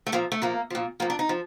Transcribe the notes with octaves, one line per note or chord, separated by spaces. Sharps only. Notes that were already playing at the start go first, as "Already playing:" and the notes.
A3
A#2 F3 A#3
A3
A#2 F3 A#3
A#2 F3
A#2 F3 A#3
D4
D#4
F3